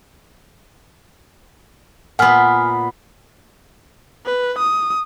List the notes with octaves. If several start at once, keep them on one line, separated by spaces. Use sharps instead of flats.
A#2 B3 F#5 G#5 F6
B4
D#6